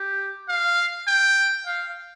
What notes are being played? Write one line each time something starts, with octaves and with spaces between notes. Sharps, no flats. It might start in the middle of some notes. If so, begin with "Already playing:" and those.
Already playing: G4
F5
G5
F5